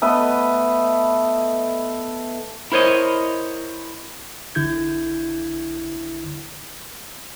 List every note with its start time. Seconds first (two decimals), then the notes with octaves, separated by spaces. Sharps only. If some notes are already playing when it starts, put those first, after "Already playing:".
0.02 A3 B3 B4 D#5
2.72 E4 A#4 C5 C#5 D#5
4.55 A#1 D3 E4 G6 G#6